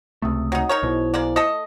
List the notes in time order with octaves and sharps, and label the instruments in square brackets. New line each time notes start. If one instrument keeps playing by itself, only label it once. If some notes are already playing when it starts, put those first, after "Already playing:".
[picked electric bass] C#2 C3 A3 [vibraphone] D#6
[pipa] F#3 D#4
D#4 A#4 C#5
[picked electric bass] B1 B2 [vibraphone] E4 C5
[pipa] G#3 A#3 D5
A3 A4 D#5